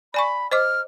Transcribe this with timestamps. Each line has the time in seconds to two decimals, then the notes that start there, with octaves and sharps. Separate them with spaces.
0.14 D5 G#5 B5 C#6
0.52 C5 D#5 D6 F6